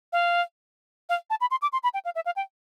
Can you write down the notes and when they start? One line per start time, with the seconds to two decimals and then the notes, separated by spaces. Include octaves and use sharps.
0.12 F5
1.09 F5
1.30 A5
1.41 B5
1.51 C6
1.62 D6
1.73 C6
1.83 B5
1.94 G5
2.05 F5
2.15 E5
2.26 F5
2.36 G5